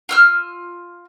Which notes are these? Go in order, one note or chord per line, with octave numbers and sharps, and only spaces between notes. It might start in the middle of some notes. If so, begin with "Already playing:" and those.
F4 E6 F6